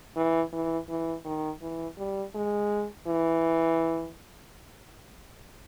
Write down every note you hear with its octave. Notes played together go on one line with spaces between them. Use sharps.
E3
E3
E3
D#3
E3
G3
G#3
E3